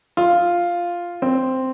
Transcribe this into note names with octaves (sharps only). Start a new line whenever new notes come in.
F4
C4